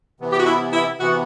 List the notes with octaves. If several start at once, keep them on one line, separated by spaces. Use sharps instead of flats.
C3 E3 B3
G4
F#4
E4
E4
C3 E3 B3 F#4